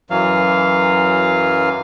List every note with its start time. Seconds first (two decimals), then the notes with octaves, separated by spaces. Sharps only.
0.10 F#2 E3 F#3 F5